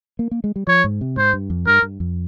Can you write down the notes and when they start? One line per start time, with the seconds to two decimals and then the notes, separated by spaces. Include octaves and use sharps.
0.19 A#3
0.31 A#3
0.44 G#3
0.56 G3
0.67 F3 C#5
0.84 G#2
1.01 C3
1.17 G#2 C5
1.33 G2
1.50 F2
1.66 G2 A#4
1.82 G2
2.00 F2